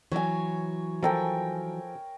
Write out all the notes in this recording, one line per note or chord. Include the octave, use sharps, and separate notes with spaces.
E3 F#3 C#5 G#5
F3 A4 A#4 G5 G#5 A#5